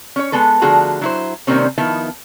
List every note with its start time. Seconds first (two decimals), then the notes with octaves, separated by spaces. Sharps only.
0.16 C#4 C#5
0.32 G#3 B3 A4 B4
0.62 D3 F3 A3 F#4 G#4 A#5
1.01 F#3 E4 C5
1.47 C3 D#3 G3 A#3 C4 C#4
1.78 D#3 F3 B3 E4